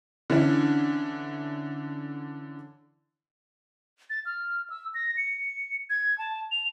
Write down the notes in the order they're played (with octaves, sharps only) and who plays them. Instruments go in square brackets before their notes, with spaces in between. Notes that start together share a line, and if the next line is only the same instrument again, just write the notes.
[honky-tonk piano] D3 E3 C#4 D4 E4
[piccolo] A6
F6
E6
A#6
C#7
G#6
A5
F7